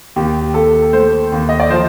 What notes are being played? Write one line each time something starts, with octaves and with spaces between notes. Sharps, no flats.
D#2 G4
D#2 A4
A3 C5
D#2
D#5
D5
F3 C5